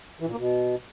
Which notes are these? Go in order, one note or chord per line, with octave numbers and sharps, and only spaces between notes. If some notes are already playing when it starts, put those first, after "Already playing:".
E3
A#2
A#3
B2